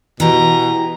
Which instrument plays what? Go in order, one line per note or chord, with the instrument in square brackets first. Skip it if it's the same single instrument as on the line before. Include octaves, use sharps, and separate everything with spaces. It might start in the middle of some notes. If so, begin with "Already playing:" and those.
[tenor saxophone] B2 [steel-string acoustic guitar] E3 G4 [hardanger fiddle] A#5